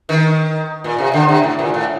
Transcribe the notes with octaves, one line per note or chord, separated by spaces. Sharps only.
D#3
A#2
C3
D3
C3
A2
A#2
A2